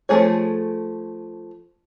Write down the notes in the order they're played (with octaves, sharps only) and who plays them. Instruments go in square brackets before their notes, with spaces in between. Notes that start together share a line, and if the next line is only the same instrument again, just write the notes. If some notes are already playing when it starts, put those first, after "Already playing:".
[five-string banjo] F3 F#3 A3 G#4 C#5